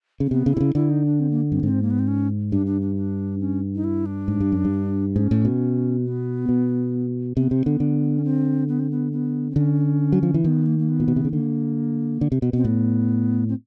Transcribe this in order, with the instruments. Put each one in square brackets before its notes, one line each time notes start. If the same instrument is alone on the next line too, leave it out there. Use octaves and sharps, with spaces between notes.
[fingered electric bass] C#3
[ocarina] C4
[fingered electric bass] C3 [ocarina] B3
[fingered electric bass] C#3
[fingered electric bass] C3 [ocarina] E4
[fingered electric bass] C#3
[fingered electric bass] D3 [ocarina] E4
[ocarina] D#4
D4
C4
A#3
[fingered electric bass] G2 [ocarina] C4
[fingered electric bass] G#2 [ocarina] C4
[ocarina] A#3
B3
C4
C#4
[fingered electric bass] G2 [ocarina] D4
[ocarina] D4
D4
D4
C#4
D#4
E4
D4
[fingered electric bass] G#2
G2
F#2
G2
[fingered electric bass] G#2 [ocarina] C#4
[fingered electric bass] A2
B2
[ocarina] B3
[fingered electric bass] B2
[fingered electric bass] C3 [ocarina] B3
[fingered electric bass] C3 [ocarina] C4
[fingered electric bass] D3 [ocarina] B3
[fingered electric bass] D3
[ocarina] C#4
C4
B3
C4
B3
B3
C4
[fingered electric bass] D3 [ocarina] C#4
[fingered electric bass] F#3
F3
E3
[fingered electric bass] D#3 [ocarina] B3
[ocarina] A#3
A#3
B3
[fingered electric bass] A#2
B2
C3
C#3
[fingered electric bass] D3 [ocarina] A#3
[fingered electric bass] D3
C3
B2
[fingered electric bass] B2 [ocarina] C4
[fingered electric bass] A2 [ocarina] B3
[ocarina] C4